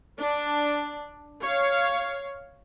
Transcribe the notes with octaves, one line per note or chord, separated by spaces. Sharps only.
D4
C#5 F5